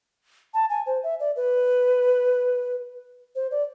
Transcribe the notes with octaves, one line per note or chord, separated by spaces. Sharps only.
A5
G#5
C5
E5
D5
B4
C5
D5